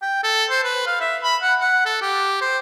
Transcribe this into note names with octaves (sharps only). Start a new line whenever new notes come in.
G5
A4
C5
B4
F5
E5
B5
F#5
F#5
A4
G4
C5